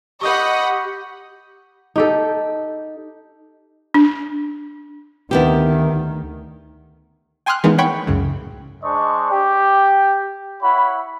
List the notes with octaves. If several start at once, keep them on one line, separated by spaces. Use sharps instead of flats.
G4 D#5 F#5 B5 C#6 D#6 G6
D#4 G4 A4
D4
D2 D#3 B3 E4 G4
G5 G#5 C6 D#6 F6 F#6
E3 G#3 A#3 B3 D#4
C#5 F#5 G5 B5 C#6
C#2 F#2 A2 C#3
G#3 D4 C5 D5 D#5 C#6
G4
E4 C#5 F#5 B5